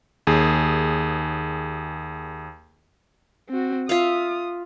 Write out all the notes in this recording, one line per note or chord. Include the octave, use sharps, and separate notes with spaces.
D#2 G#4
C4 F#4
F4 E5 F5 D#6